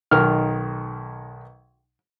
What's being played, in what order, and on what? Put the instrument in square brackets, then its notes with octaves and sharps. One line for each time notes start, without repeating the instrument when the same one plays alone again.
[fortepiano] B1 D#3 F6